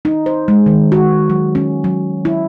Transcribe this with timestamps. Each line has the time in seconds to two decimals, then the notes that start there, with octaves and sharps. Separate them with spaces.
0.05 D#4
0.26 C5
0.48 G#3
0.66 D#3
0.92 F#4
1.30 F#3
1.55 C#4
1.84 F#3
2.25 E4